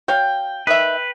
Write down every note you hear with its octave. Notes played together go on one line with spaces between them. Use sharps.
F#4 C#5 F5 G5
D#3 B4 E5